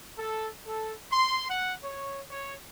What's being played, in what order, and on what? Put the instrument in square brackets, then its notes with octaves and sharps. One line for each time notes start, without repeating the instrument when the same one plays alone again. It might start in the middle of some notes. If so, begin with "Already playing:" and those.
[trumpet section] A4
A4
C6
F#5
C#5
C#5